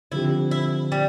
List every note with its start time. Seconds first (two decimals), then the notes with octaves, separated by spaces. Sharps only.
0.11 D3 F3 C4 E4 G4
0.51 E4
0.92 G3